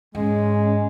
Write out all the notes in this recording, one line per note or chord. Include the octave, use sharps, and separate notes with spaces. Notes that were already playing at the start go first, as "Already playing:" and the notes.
G#2 G#3 C#4